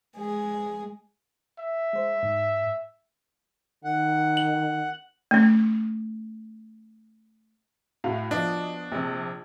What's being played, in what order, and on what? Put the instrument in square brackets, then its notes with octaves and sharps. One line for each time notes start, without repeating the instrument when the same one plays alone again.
[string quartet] G#3 G#4
[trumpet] E5
[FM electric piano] G#3 C5
G#2
[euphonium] D#3 [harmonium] F#5
[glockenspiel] F#7
[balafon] A3 C#4
[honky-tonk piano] A2 F#4 F5
[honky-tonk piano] B2 F3 D#5 [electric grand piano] D4
[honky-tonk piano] A#1 C3